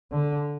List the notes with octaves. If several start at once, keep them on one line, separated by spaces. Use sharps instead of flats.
D3